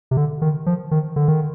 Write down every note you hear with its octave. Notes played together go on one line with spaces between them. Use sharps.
C3
D3
D#3
F3
D#3
D3
D#3